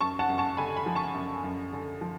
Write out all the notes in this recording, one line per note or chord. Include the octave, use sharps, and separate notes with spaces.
F#2 A5 C#6
F#5 A5
F#2
A5 C#6
D3 G#5 B5
G#5 B5
F3
A5 C#6
F#2
F#2
D3
F3